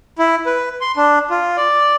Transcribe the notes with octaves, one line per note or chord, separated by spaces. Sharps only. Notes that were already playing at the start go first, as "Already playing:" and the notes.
E4
B4
C6
D4
F4
D5